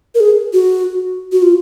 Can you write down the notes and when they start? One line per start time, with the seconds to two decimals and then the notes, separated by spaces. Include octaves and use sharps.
0.15 A#4
0.20 G#4
0.53 F#4
1.32 F#4
1.42 F4